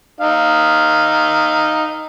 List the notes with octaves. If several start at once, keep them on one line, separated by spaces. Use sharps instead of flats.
D#4 F5